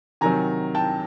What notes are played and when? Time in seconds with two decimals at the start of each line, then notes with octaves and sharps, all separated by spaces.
0.21 C3 D#3 F#3 G#5 A#5
0.75 G5 A5